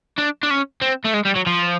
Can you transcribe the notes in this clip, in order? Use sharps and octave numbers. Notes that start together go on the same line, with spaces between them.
D4
D4
C#4
C4
A3
G#3
G3
F#3
F3